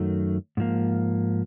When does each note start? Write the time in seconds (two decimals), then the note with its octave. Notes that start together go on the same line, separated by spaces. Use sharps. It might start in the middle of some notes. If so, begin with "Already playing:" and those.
Already playing: F#2 D#3 F#3 A3
0.57 G#2 F3 A#3